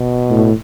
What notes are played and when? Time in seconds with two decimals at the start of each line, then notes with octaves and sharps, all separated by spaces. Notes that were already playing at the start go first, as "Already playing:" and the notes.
Already playing: B2
0.30 A2